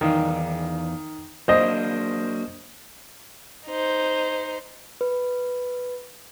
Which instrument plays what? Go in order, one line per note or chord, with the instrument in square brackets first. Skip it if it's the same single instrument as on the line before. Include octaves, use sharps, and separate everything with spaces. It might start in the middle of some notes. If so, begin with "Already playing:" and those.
[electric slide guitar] E2 D5 F5 [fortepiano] D#3
[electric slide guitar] F#3 A#3 D4 [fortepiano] C5 D#5
[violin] D#4 C5
[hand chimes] B4